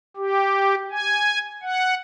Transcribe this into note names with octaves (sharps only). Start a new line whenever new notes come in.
G4
G#5
F#5